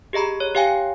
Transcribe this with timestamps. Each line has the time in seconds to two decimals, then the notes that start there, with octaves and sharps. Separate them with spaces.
0.13 G4 G#4 D#5 A#5 B5
0.40 C#5
0.55 G4 C#5 F5 G5 G#5